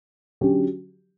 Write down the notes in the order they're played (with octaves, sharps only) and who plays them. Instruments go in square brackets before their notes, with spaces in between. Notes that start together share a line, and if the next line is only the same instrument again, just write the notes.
[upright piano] D3 F#3 C#4 G4